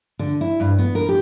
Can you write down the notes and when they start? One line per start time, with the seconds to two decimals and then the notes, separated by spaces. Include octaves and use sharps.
0.19 D3
0.41 E4
0.60 G2
0.79 B3
0.95 A#4
1.09 G4